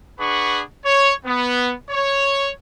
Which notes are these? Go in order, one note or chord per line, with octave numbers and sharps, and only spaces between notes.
D4 G#4 B4 F#5 B5 C#6
C#5
B3
C#5